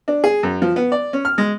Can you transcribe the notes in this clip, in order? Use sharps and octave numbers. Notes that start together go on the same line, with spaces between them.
D4
G#4
F#2
F3
B3
D5
C#4
F6
G#3